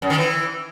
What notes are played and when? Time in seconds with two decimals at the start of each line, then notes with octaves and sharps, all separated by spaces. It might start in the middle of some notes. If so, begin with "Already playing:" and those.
0.02 F#2
0.10 D#3
0.18 E3